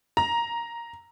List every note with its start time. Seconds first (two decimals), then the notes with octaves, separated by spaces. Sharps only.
0.17 A#5